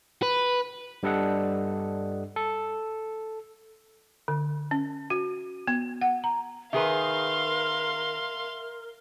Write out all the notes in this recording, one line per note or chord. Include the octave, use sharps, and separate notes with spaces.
B4
G2 G3 D4 A4 D#5 F#5
A4
D3
C#4
F#4
B3
F#5
A#5
D#3 G#4 A#4 B4 E5 F5 C6